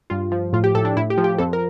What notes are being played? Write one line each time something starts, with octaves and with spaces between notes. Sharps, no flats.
G2 F4
F3
A2 F4
G4
A2 A4
D4
A2 E4
G4
F3
G4
F2 A4
A#4